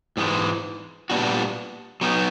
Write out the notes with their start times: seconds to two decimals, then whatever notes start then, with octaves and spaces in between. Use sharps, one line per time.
0.17 G#2 E3 G#3
1.10 A#2 G3 B3 D4 F#4
2.01 F#3 B3 D#4